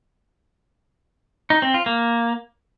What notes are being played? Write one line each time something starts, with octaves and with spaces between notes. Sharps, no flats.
D#4
C4
F4
A#3